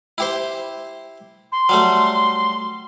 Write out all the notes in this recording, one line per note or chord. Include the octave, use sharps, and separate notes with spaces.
E4 G4 C5
C6
F#3 G3 A3